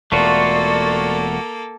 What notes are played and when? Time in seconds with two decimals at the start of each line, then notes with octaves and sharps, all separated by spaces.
0.12 E1 A3 A#3 F4 F#4 A4 D5